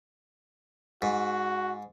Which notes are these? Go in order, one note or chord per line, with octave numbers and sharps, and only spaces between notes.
G#2 F#4